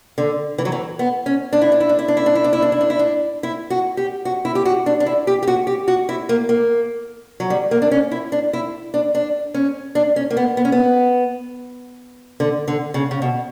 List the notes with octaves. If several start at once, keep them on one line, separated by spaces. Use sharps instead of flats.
D3
E3
F#3
E3
B3
C#4
D4
E4
D4
E4
D4
E4
D4
E4
D4
E4
D4
E4
D4
E4
D4
E4
D4
E4
F#4
G4
F#4
E4
G4
F#4
D4
D4
E4
G4
G4
F#4
G4
F#4
E4
A#3
A#3
F#3
G3
A#3
D4
C#4
E4
D4
E4
D4
D4
C#4
D4
C#4
A#3
B3
B3
C#4
B3
D3
D3
C#3
C#3
B2